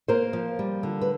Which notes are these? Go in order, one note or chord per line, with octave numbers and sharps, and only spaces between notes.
A#3 A#4 C5
F3
G3
D3
B4